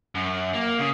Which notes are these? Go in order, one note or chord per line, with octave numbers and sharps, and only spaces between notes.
F#2
A#3
C#3